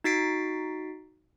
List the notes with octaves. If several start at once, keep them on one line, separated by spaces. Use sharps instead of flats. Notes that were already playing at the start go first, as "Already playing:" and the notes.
D#4 F#4 A6 B6 C7 D7